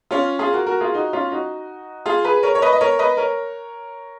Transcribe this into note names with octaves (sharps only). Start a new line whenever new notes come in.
C#4 F4
F4 G#4
F#4 A#4
F#4 A#4
F4 G#4
D#4 F#4
C#4 F4
D#4 F#4
F4 G#4
G#4 B4
A#4 C#5
C#5
B4 D#5
D#5
A#4 C#5
B4 D#5
A#4 C#5